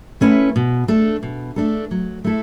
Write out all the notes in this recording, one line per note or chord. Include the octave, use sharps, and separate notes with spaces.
A3 C#4 E4 B4
B2
A3 D4 A4
B2
A3 D4 A4
F#3
A3 E4 A4